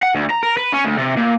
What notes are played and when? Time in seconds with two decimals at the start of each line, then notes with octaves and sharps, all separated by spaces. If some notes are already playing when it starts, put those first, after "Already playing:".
0.03 F#5
0.14 D2
0.30 A#5
0.43 A#4
0.57 B4
0.73 C#4
0.85 D2
0.99 C3
1.17 A#2